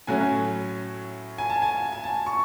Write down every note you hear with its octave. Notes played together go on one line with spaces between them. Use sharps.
A2 F#3 A3 C#4 G#5
G#5
A5
G#5
G#5
A5
C#6